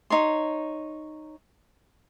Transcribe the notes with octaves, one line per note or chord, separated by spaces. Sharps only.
D#4 C#5 C6